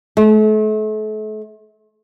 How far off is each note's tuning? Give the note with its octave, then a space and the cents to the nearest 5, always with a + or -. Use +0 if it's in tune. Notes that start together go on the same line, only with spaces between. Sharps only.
A3 -40